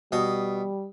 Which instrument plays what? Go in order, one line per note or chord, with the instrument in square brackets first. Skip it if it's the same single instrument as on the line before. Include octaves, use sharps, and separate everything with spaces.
[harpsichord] B2 D#6 [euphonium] G3